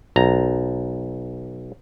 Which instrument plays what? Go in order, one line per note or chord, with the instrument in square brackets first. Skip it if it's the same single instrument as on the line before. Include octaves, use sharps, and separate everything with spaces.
[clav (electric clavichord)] B1 A#5